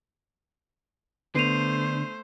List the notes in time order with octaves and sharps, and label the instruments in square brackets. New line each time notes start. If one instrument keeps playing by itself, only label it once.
[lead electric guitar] D3 [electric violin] A3 C5 [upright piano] B3 [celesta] C7 D#7 F7